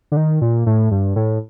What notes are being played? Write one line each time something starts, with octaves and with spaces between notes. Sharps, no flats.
D3
D#3
A#2
A2
G2
A2